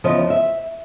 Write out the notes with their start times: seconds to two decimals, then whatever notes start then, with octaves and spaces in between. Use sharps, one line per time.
0.04 E2 C#3 F3 D#5
0.30 E5